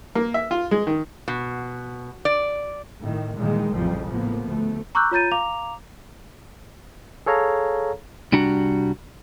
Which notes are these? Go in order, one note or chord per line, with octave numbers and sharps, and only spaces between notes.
A#3
E5
F4
G#3
D#3
B2
D5
A2 D#3
A#2 D#3 E3 G3 G#3
A1 F2 C#3 F3 G3
A2 F3 A#3 B3
D2 A3
A#5 C#6 D6 E6 F#6 G6
F4 C#5 A#5 G6 A6 D#7
F5 A#5 D6 F7
G#4 A4 C#5 F5 A#5
C2 G3 D4 F#4 A#5